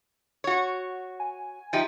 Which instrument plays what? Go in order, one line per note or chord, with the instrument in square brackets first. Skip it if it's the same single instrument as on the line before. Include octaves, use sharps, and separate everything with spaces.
[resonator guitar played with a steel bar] F#4 C#5
[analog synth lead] G#5
[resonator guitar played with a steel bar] F3 D#4 G4 [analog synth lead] E5